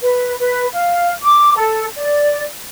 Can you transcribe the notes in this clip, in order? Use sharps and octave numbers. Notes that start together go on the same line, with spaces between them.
B4
B4
F5
D6
A4
D5